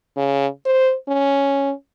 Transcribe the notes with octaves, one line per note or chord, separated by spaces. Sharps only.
C#3
C5
C#4